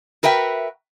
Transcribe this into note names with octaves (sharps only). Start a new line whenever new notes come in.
F#4 A#4 B4 E5 G5